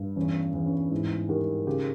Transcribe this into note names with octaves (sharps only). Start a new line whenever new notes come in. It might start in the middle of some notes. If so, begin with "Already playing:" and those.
Already playing: G2
E2 C#4
E2
C#4
G#2 E4
D#3 G4
C#3 G4